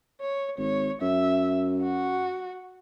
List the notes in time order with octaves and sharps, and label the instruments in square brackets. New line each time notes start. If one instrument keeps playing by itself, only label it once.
[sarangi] C#5
[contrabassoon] G#1 [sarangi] C#5
[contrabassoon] F#2 [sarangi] E5
[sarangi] F#4